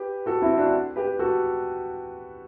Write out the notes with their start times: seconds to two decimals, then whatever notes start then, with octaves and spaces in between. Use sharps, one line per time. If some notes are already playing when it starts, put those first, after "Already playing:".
Already playing: G4 B4
0.26 F#4 A4
0.42 C4 E4
0.57 D4 F#4
0.96 G4 B4
1.19 F#4 A4